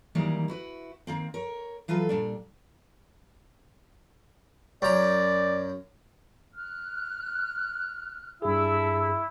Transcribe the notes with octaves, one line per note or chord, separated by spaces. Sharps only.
D#3 E3 F#3 G3 A#3 D#4
E4 F#4 B4
D#3 A#3 C4
A#4 C#5
E3 F#3 F4 A4 B4
A#2 G3 D4
F#2 D5 A#5
F6 F#6
G2 E4 G#4 A4 E6